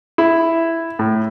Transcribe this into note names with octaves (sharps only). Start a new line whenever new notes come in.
E4
A2